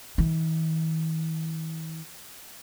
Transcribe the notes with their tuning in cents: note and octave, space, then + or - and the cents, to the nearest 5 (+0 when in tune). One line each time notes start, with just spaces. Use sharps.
E3 -45